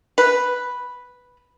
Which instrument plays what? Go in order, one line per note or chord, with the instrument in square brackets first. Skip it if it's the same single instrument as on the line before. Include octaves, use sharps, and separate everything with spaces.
[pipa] B4